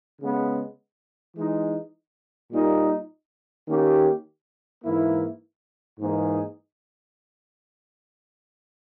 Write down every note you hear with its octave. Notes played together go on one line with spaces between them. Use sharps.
C#3 G#3 B3
E3 G#3 D#4
A#2 G3 A#3 D#4
D#3 A#3 C#4 G4
G#2 E3 A#3 E4
G#2 E3 A#3 D#4 G#4